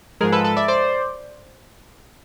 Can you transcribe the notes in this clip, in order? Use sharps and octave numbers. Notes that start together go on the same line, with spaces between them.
G#2 F3 G#3 G#4 A#4
A4 B4
A4 B4
D5 E5
C5 D5